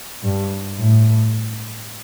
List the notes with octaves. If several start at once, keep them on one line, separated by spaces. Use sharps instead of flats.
G2
A2